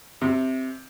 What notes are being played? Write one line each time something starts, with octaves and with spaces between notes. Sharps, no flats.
C3